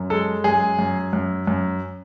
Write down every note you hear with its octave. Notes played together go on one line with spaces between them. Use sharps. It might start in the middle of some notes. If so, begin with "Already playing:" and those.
Already playing: F#2
G#3 A4
F#2 G#4
F#2
F#2
F#2